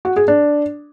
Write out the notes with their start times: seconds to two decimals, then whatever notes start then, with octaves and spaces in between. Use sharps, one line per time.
0.05 F#4
0.16 G#4
0.28 D4